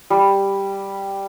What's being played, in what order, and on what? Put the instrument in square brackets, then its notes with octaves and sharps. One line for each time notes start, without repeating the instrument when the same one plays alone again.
[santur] G3